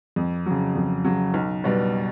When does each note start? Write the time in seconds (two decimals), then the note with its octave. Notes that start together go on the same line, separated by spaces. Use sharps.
0.16 F2
0.46 C#3 F#3
0.76 F2
1.05 C#3 F#3
1.34 B1
1.64 B2 G3